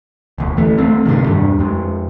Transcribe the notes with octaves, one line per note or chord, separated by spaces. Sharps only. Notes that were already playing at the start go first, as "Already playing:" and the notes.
E1 D2
E3 A3
D2 A3 C4
G2 C3 D#3
E2 G2 G3 D4
F2 G#3